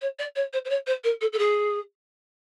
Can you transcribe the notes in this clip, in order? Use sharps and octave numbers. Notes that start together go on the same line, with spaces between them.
C#5
D5
C#5
C5
C5
C#5
C5
A#4
A4
A4
G#4